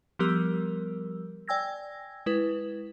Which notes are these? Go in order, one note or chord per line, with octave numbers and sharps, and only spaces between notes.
F3 G3 B3 G4 A#4 E6
D5 G5 G#5 E6 G#6 A#6
G#3 E4 B4